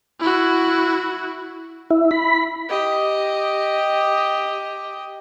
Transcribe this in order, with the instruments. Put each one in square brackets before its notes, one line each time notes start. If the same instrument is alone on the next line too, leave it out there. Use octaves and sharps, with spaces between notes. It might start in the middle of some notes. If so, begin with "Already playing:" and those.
[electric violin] E4 F#4
[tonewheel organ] E4
B5
[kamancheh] G4 D#5